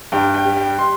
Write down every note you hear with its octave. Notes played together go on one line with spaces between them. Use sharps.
G2 G5
G5
G3
G5
C6